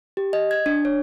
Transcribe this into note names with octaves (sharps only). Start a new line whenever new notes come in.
G4
D#5
G#6
D4
C#5